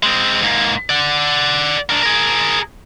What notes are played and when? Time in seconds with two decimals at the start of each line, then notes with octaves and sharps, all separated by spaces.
0.03 G#3 C4
0.42 G#2 A#3
0.90 D5 F#5
1.90 D4 A#4
2.03 G#4 A#4